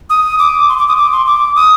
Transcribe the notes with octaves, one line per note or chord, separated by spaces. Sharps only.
D#6
D6
C6
D6
D#6
D6
C6
D6
D#6